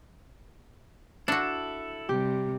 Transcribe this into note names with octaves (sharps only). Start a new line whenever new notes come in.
D4 E4 F#4 A4
C3 G3 G4